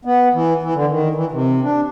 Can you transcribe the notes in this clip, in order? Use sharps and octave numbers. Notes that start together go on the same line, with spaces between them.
B3
E3
E3
D3
D#3
E3
C3
D4